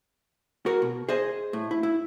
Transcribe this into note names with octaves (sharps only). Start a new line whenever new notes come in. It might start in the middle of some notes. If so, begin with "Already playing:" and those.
F#4 A#4
B2
G#4 C5 D#5
A2
E4
E4